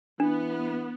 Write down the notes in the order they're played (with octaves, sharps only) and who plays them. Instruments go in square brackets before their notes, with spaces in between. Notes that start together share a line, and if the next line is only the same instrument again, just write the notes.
[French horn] E3 [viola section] B3 [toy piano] D4